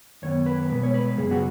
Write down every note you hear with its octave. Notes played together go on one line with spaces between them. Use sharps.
F#2 D#3 B3 C#5
B4
B2 G#3 B3 B4
C#5
B4
F#2 C#3 B3 G#4
F#4